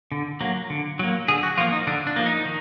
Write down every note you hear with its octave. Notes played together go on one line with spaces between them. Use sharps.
D3
F#3 A#3
D3
F#3 A#3
D3 G#4
F#4
F3 A#3 F4
D#4
D3 D4
D4
F3 A#3
D#4
D#3